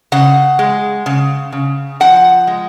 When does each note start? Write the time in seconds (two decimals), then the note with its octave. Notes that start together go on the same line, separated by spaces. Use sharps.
0.12 C#3 F#5
0.59 G#3
1.06 C#3
1.53 C#3
2.00 F3 F#5
2.47 G#3